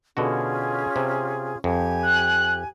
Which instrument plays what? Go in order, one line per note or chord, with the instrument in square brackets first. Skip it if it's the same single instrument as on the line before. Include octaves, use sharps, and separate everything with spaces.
[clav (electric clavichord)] B2 D3 F#4 [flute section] C#4 F4 G#4
[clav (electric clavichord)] C3
[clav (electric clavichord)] F2 [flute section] G4 G#5
[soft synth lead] F#6